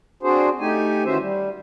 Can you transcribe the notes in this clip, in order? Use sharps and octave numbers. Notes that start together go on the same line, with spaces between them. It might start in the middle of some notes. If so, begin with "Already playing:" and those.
C4 D4 F#4 G#4 C5
A3 D#4 G4 G#5
D#3 E3 C#4 F#4 C5 E5
G3